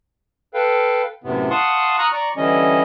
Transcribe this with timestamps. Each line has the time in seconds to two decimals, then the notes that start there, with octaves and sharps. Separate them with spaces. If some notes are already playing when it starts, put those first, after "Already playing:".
0.54 A4 B4 F5 G5
1.24 F#2 A2 C3 B3
1.50 F5 F#5 A5 C6 C#6 D#6
1.98 A#5 C#6 D#6 F6 F#6
2.13 D5 A#5 C#6
2.37 D3 E3 G3 C#4 D#5